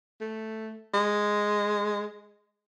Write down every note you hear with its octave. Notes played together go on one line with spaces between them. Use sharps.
A3
G#3